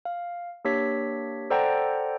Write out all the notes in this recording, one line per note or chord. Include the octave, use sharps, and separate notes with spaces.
F5
A#3 D4 G4 C#5 B6
A4 C5 D5 F#5 G5 A#5